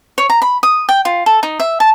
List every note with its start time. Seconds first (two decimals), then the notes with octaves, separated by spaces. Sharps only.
0.18 C#5
0.30 A#5
0.42 B5
0.63 D#6
0.89 G5
1.05 F4
1.26 A4
1.43 D#4
1.60 E5
1.80 A5